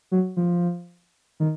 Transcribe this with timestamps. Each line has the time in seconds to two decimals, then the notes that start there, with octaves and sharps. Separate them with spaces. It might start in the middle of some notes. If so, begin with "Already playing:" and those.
0.12 F#3
0.37 F3
1.40 D#3